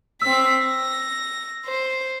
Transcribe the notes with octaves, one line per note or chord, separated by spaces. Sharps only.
C4 E6 B6
A#6
C5